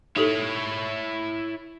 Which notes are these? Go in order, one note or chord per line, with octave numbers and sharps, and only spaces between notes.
D#4 E4 G4 A4 C#5